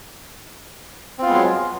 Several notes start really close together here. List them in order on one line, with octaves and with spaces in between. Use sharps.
C4 F4 B3 G#3 F#3